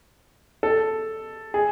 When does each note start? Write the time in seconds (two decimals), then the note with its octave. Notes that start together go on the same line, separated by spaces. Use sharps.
0.63 A4
1.54 G#4